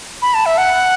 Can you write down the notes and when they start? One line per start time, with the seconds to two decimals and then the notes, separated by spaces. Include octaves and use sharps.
0.22 B5
0.34 A5
0.46 E5
0.58 F#5